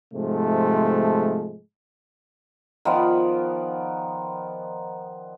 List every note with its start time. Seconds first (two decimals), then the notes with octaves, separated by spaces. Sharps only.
0.14 G#2 C3 F3 G#3 A3
2.85 D#3 F3 B3 D5